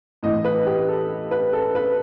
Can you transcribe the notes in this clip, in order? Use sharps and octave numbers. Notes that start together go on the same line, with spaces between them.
A2 E3 D#5
B4
G4
A4
B4
A4
B4